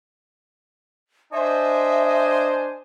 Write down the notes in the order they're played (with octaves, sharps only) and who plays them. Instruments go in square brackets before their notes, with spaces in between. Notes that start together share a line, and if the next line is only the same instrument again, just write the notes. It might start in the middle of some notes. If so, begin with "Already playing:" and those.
[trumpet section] D4 C5 G#5 [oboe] D#5 [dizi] E5